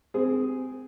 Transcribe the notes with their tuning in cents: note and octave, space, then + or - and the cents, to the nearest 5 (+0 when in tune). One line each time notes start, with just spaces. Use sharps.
C4 -25 G#4 +0